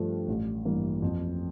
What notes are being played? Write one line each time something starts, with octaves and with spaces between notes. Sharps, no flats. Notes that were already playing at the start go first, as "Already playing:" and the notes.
Already playing: G2 F3 A3
A1
G2 E3 A#3
F2